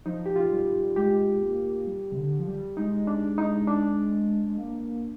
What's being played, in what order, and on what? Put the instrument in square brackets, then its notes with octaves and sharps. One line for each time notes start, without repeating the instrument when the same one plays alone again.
[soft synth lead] F3 [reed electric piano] D#4
[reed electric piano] G4
F4
[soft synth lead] G3
[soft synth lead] G#3 [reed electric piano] G4
[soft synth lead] A#3
G3
C3
D3
F3
G3
[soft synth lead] G#3 [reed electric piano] D#4
[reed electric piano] D4
D#4
D4
[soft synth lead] G#3
A#3